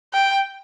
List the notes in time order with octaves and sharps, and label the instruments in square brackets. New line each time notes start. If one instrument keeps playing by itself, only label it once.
[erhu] G5